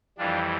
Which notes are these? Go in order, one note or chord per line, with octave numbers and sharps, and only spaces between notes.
F2 E3 G3 D4 F4